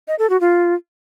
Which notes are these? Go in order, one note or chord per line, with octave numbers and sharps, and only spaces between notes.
D#5
A4
F#4
F4